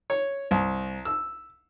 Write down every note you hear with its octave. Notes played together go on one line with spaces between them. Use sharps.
C#5
C2
E6